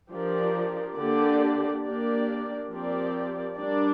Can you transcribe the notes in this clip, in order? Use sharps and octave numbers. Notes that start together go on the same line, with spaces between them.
F3 D4 G4 A#4 D5
D3 A#3 D4 G4 D5
A#3 D4 G4 A#4 D5
F3 C4 G4 A#4 D5
G3 D4 A#4 D5